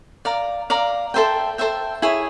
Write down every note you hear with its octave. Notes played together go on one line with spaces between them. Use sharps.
D5 F5 A#5
D5 F5 A#5
A4 C5 E5 G5
A4 C5 E5 G5
E4 G#4 C#5 E5